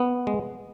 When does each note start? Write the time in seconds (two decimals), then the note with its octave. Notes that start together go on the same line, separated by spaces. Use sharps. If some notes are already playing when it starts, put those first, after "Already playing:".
Already playing: B3
0.27 G#3